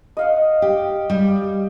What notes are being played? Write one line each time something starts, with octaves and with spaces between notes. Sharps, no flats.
D#5 F5 F#5
G4
G3 G4